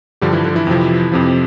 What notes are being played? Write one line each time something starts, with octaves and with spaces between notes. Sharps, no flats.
G2 D3 F3 G3 G4
E3 E4
D3 D4
E3 E4
F2 C3 F3
F2 C3 F3